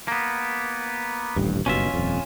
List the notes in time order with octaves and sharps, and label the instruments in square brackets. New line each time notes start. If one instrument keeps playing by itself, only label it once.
[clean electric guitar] A#3 B3
[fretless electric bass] D#1 A1 G2
[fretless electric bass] F#1 G2 B2 [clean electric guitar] C#4 F4 E5
[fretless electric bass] D#1 F2